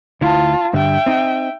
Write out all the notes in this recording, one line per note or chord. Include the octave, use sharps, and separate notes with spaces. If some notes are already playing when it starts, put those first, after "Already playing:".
D2 E4 F4 A5
G2 D3 G3 E5 G5
C4 D#4